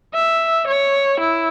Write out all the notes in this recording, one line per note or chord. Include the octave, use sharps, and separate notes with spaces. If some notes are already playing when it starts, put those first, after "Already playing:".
E5
C#5
E4